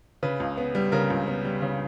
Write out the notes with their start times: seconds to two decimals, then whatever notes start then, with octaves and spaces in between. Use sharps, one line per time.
0.23 C#3 B4
0.40 C#2
0.57 B3
0.75 G3
0.92 C#3 A#4
1.10 C#2
1.27 B3
1.45 G3
1.62 C#3